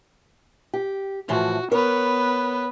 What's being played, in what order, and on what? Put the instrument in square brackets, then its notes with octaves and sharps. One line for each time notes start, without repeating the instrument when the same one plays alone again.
[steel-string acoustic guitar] G4
[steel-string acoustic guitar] A2 E3 F3 [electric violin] F#4
[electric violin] B3 B4 [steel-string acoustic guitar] A#4 C#5